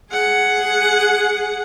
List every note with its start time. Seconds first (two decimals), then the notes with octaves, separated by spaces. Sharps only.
0.11 G#4 F#5